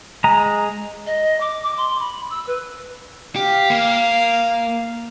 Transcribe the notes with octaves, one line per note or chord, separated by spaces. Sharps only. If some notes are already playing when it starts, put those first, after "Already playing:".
G#3 G#4 A#5
D#5
D6
D6
C6
B5
E6
B4
G4 F5
A#3